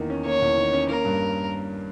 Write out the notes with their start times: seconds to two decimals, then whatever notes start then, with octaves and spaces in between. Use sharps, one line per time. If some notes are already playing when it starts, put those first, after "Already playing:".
Already playing: E2 D#3 A#3
0.10 C#4
0.25 A#3 C#5
0.42 E2
0.57 D#3
0.73 C#4
0.89 A#3 A#4
1.05 G2